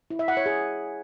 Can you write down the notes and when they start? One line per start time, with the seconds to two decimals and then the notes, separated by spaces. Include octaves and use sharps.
0.10 E4
0.19 E5
0.28 F#5
0.37 C#5
0.46 G#4